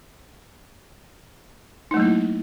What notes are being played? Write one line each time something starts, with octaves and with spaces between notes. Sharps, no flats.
F#3 A3 A#3 D#4 E4